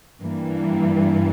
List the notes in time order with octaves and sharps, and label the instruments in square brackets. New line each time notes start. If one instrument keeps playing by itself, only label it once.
[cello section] G2 E3 G3 A#3